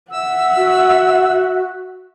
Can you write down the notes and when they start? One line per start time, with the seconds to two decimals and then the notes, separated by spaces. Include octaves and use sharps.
0.11 E5 F#5 E6
0.57 F#4